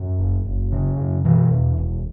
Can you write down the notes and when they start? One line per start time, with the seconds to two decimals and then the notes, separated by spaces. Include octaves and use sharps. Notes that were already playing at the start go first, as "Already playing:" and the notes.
Already playing: F#2
0.19 F#1
0.45 F#1
0.72 C#3
0.98 F#2
1.24 B2 E3
1.50 E2
1.78 E1